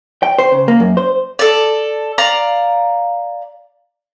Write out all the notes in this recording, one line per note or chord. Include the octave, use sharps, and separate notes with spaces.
G5
C5
C#3
A#3
F#2
C5
A4 D5
D5 F5 A#5